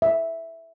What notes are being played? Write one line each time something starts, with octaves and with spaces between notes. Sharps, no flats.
E5